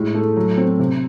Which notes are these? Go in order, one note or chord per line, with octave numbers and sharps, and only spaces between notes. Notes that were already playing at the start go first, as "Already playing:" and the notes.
Already playing: A2 G#3
A3
F#3
C4
C3